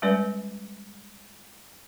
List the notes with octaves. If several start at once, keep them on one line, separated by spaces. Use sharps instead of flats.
G3 G#3 C#4 B4 D5